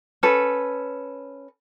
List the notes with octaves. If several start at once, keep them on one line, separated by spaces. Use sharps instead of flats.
C#4 A4 B4